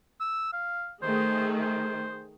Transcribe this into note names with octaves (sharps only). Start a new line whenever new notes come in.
E6
F5
D#3 A3 G#4 C5
C5